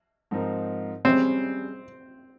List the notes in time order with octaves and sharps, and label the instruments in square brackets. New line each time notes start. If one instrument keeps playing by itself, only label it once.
[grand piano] G#2 F3 C4 D#4 A#4
[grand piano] G3 C#4 G#4 C#5 [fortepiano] C4